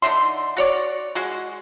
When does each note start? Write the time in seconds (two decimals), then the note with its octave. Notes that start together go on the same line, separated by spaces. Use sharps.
0.02 D3 D#4 E5 C6
0.57 F#4 C#5 D5
1.15 G#3 F#4